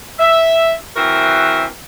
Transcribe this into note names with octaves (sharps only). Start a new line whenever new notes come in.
E5
E3 C4 F#4 A#4 E5